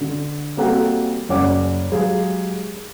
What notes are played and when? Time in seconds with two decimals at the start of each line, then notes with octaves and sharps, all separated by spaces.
0.01 D3
0.57 G3 A#3 C4 F#4 A4 F#5
1.29 F#1 C#4 D5 F#5 D6
1.92 F#3 G#3 G4 G#4 F5